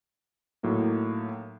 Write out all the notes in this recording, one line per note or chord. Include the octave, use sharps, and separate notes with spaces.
A2 F#3 A#3 D#4